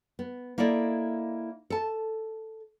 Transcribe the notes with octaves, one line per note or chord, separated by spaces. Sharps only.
B3
A#3 E4 A4 D5 D#5
A4 A5